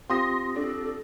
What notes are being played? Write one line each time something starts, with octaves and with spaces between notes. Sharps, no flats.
C4 F4 G4 C6 D#6 A#6
D4 A4